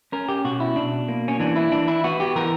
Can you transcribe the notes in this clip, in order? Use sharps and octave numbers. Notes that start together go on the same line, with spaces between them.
C#4 A#4
G4
B2 F#4
E4
B2 D4
A#3
C#4
E3 D4
E4
E3 D4
E4
B3 F#4
G4
E3 A#4